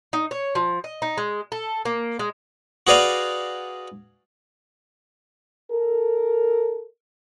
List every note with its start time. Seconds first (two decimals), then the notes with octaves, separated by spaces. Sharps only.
0.13 D#4
0.31 C#5
0.55 F3
0.84 D#5
1.02 D#4
1.17 G#3
1.52 A4
1.85 A#3
2.19 G#3
2.87 F#4 G#4 B4 D5 F5
5.71 A4 A#4